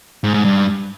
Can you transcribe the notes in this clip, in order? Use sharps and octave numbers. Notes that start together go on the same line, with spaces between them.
G#2
G#2
G2